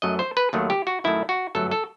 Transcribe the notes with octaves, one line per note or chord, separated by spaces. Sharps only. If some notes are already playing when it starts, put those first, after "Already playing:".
F#2 F#3 A3 D#5
C5
B4
D#2 D#3 F#3 A3
G4
F#4
F#2 D#3 A3 E4
F#4
G1 F#2 F#3 A3 A4
A4